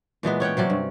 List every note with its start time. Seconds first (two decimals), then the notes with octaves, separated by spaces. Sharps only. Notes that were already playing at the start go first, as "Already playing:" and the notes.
0.23 A#2 E3 G#3 B3
0.40 C#4 C#5 F#5 G5
0.57 C3 F#3 C#4 D5
0.70 G2